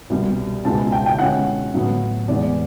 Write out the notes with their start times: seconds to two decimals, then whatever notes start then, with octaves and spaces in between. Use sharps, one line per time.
0.10 C2 B2 G3
0.65 C#2 B2 G#3 C4 E4 A5
0.92 G5
1.06 G5
1.19 B2 G#3 C#4 E4 F#5
1.74 A2 F#3 B3
2.28 E2 C3 E3 G#3 B3 D5